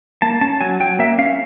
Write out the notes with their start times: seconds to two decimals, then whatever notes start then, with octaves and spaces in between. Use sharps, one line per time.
0.22 A#3 A5
0.41 C#4 A5
0.61 F#3 G#5
0.80 F#3 G5
0.99 A#3 E5
1.18 C#4 F5